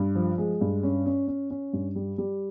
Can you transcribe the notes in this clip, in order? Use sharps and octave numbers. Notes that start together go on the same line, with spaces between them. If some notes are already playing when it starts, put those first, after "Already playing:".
Already playing: G2
F3
G#3
G2
C#4
C#4
C#4
C#4
G2
G3
G3